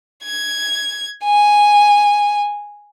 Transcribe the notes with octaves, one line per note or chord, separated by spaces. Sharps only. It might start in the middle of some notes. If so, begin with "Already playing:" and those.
G#6
G#5